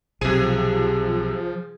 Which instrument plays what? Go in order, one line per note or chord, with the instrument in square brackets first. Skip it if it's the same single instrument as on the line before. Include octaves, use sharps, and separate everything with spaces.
[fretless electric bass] B1 [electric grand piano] C3 D#7 [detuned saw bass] F3 [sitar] G#4